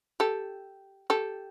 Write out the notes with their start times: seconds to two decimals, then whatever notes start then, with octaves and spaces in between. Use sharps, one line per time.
0.20 G4 A4
1.10 G4 A4